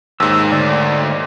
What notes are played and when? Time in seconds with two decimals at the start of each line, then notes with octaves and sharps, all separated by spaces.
0.20 D#2 G#2 E6
0.52 D2 D5